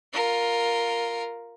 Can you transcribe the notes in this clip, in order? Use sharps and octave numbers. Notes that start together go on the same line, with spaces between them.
F4 A#4